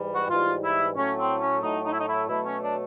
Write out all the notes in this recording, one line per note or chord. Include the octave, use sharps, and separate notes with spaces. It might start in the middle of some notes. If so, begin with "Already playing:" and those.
Already playing: G#2 E3 G3
F#4
G#2 E3 G3 F4
E4
A2 F#3 A3 C#4
C4
C#4
A2 F#3 A3 D#4
D#4
E4
D#4
E4
B2 F#3 A3 E4
C#4
D4